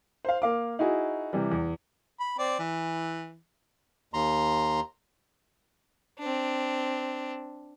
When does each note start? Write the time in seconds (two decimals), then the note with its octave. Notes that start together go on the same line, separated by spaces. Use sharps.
0.25 C5 F5
0.42 A#3 F5 D6
0.79 D#4 E4 F#4 G#4
1.33 C3 E3 G3
1.51 E2
2.20 B5
2.38 C4 D5
2.59 E3
4.14 D#2 A#5 C6
6.19 C4 D4